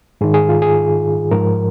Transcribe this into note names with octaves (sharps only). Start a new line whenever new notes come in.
G#2 D#3 G#4
G#4
F4
G#4
G#2 F3 A#4